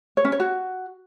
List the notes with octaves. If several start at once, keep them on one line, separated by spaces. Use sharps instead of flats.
C#5
C#4
C#5
F#4